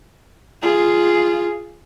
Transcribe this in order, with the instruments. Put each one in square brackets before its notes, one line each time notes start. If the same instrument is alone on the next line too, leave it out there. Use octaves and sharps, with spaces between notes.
[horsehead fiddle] F4 G#4